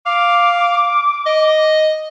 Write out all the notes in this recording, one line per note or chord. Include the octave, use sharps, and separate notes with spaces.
F5 D6
D#5